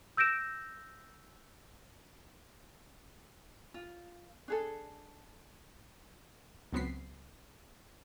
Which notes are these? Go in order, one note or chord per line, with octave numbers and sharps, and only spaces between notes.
E6 G6 A#6 D7 E7
F4
D4 G#4 A4
C#2 F#3 B3 C4 B6 C7